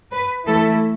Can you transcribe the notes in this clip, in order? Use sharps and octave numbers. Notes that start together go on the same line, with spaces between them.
B4
E3 A3 E4 A4